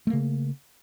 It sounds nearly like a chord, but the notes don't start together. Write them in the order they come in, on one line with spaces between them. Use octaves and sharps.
A3 A#3 C#3